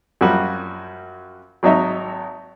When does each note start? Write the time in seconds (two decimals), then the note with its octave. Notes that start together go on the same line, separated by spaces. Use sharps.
0.21 F#2 F3 G3 F#4
1.63 G#1 F#3 D#4 E5